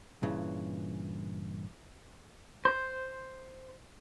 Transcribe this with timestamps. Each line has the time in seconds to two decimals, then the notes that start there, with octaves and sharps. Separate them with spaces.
0.23 G2 A#2 C#3 E3
2.65 C5